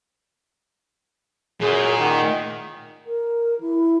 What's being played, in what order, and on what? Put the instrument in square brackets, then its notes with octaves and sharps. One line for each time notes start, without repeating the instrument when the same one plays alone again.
[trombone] F#2 [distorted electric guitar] A#2 [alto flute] G#4
[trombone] D#3 [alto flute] F#5
[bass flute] A#4
E4